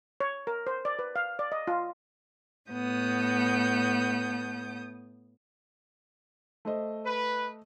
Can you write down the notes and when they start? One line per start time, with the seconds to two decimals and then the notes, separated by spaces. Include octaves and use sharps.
0.20 C#5
0.47 A#4
0.67 C5
0.85 D5
0.99 B4
1.16 F5
1.39 D5
1.52 D#5
1.67 F4
2.71 A2 B3 D#6 G6
6.65 A3 C5 D#5
7.05 B4